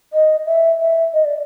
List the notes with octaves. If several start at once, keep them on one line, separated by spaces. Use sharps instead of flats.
D#5
E5
E5
D#5
D5